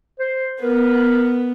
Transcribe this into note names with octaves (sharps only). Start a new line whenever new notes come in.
C5
B3 A#4 B4